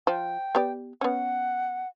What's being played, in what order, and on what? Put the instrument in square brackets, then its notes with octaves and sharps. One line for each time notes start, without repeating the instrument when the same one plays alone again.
[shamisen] F3 [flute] G5
[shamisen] B3 G4 D5
[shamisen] B3 C#4 [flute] F#5